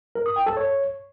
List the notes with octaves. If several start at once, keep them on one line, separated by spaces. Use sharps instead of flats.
A#4
D#6
G5
A4
C#5